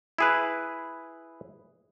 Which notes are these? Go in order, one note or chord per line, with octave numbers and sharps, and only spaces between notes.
E4 G#4 B4